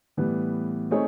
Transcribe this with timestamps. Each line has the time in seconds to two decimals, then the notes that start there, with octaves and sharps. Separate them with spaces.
0.17 A2 E3 G3 B3
0.91 A3 C4 D#4 G#4 C#5